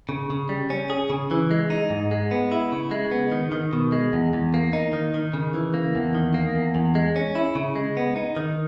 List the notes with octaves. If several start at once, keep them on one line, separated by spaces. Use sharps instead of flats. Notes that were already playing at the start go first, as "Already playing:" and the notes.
C#3
C#3
G3
C#4
G#4
C#3
E3
G#3
D#4
G#2
G#3
B3
E4
C#3
G#3
B3
D#3
D#3
B2
G#3
E2
E2
A#3
D#4
D#3
D#3
C#3
E3
A#3
E2
D#3
A#3
E2
E2
G#3
C#4
E4
C#3
G#3
B3
D#4
D#3